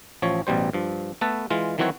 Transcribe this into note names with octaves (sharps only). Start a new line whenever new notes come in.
A1 F3 C#5
A1 B2 G3 C5
G2 F3
A3 B3 A4 B4 A5
E3 G#3 F4
D#3 E3 F#3 C4 F#4 C#5